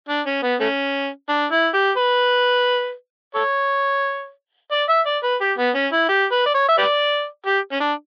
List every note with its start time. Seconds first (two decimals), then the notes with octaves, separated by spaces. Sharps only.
0.09 D4
0.26 C#4
0.43 B3
0.60 A3 C#4
1.29 D4
1.52 E4
1.74 G4
1.97 B4
3.35 A4 C#5
4.72 D5
4.89 E5
5.06 D5
5.23 B4
5.41 G4
5.58 B3
5.75 C#4
5.92 E4
6.09 G4
6.32 B4
6.46 D5
6.55 C#5
6.69 E5
6.78 G4 B4 D5
7.46 G4
7.72 C#4
7.80 D4